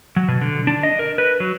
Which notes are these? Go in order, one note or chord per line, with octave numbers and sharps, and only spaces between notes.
F#3
B2
D3
D4
D#5
A#4
B4
F#3